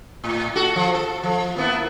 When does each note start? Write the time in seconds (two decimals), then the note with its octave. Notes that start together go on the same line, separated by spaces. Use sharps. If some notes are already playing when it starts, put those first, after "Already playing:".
0.24 A2
0.56 F#4 A4
0.76 F3
0.94 A4
1.24 F3
1.56 A#3 B3 E4